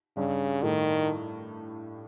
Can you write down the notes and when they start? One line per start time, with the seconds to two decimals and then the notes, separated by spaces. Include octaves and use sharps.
0.17 G2 C#3 G3
0.63 A2 D#3 A3